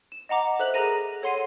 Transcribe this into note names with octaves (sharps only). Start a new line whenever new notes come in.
E7
D#5 F#5 A#5 D6
A4 C5 E5 F#6 F7 F#7
G#4 A#4 A#5 A#6 D#7
A4 C#5 F#5 C6 C7 D#7